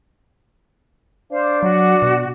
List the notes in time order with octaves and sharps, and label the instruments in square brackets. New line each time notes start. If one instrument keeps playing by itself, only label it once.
[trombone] D4 [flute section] C5 F5
[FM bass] F#3 [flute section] F#4
[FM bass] B2